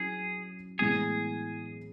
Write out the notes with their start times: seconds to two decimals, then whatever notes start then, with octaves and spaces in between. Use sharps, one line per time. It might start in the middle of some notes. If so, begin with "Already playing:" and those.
Already playing: F#3 C#4 E4 G#4
0.79 A2 E3 G#3 B3 G#4